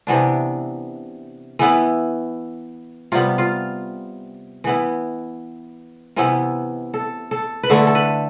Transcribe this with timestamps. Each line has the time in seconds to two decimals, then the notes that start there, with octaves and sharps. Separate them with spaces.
0.07 C3 E3 B3 D4
1.59 E3 B3 E4
3.12 C3 G3 B3 F4
3.38 F4
4.64 E3 B3 E4
6.16 C3 E3 B3 E4
6.94 A4
7.31 A4
7.63 B4
7.70 D3 A3 E4 A4
7.87 A4
7.95 B4